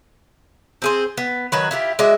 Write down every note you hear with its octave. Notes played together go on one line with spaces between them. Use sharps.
C4 G#4 C5
B3
D#3 F#3 B4
E4 F4 G4
G#3 F#4 D5 E5